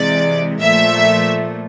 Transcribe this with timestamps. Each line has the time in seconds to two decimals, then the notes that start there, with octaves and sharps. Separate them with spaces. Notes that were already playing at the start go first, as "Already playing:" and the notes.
Already playing: C3 E3 G#3 D5
0.61 A#2 F3 A3 E5